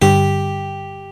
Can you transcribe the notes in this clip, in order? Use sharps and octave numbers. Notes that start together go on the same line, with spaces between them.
G2 D3 G3 G4